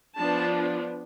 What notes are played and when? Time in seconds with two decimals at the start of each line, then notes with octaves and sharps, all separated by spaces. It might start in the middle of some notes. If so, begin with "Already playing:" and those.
0.17 F3 B3 D4 A5